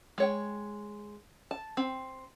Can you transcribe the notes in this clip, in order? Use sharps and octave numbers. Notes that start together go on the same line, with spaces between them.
G#3 C#5 G5
A5
C4